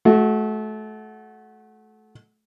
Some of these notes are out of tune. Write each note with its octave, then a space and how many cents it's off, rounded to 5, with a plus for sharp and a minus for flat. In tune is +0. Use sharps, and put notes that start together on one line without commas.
A3 -30 F#4 +0